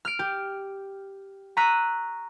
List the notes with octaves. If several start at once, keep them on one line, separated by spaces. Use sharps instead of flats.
F6 D7
G4
A#5 C#6 E6 F#6 B6 D#7